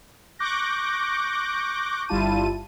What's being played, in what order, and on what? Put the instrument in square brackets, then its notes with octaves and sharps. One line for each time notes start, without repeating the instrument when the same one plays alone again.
[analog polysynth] C#6 D6 F#6 G6 A#6
G1 G3 E4 F4 A5 D#7